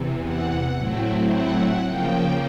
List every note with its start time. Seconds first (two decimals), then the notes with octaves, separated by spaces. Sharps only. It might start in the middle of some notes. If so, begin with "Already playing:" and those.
Already playing: E2 C3 E3
0.23 F#5
0.76 A2 F#3 A3 C4 E4
1.30 F#5
1.84 C#3 F3 A#3 G5